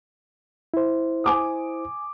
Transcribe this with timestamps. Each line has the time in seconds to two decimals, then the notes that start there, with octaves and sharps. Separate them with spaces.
0.74 E4 C5
1.24 G#5 D6 D#6